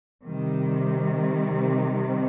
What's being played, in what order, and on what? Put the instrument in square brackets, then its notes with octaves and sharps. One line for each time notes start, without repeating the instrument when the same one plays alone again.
[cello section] C3 D#3 G3